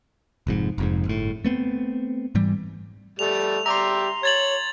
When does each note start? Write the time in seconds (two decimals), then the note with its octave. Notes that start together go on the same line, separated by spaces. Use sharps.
0.47 F1 F2 G#2
0.78 F1 F2 G#2
1.05 G1 A2
1.45 A3 B3 C4
2.35 G#2 E3 G3
3.19 G3 A3 F7
3.66 G3 G4 E5 A#5 C6
4.23 C#5 G#6 A6 F#7